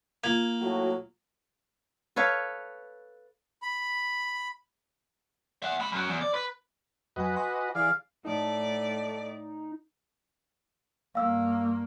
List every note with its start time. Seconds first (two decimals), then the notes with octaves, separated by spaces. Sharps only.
0.24 A#3 F4 G#6
0.60 A2 F#3 F#4
2.16 A4 B4 C#5 F5
3.62 B5
5.63 E5 F#5
5.80 G#3 B5
5.92 F#2 F#3
6.09 E2
6.21 D5
6.34 B4
7.16 F2 F#3 F#4 B4 D#5 G#5
7.36 G#5 C6 D6
7.75 E3 G#4 D5 F5
8.25 A2 D#4 A4 D5
11.15 G2 A#3 F5 E6